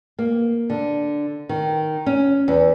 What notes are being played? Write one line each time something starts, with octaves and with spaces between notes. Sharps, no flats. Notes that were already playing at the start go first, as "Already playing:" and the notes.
A#3
D3
D#3
C#4
E2